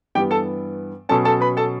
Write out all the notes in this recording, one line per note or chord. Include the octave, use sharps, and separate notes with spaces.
G2 E3 B3 G4 G5
A4 A5
B2 F#3 C#4 A4 A5
A4 A5
B4 B5
A4 A5